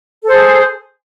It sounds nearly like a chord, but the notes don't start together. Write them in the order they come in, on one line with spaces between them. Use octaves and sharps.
A4 C5 G#4